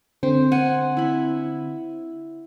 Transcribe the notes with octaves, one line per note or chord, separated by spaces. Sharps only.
D3 C4 C5
F#5 G#5
E4 B5